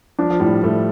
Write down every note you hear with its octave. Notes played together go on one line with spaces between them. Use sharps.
F3 D4
F3
A2 G3
A2 A3